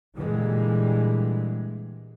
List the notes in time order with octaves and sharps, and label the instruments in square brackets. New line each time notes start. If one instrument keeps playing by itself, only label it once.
[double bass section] A#2 D3 E3 G3 G#3